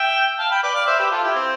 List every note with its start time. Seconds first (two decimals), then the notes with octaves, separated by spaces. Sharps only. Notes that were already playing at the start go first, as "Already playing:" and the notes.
Already playing: E5 G5
0.39 F5 A5
0.51 G5 B5
0.63 B4 D5
0.75 D5 F5
0.87 C5 E5
0.99 G4 B4
1.11 F4 A4
1.23 E4 G4
1.35 C4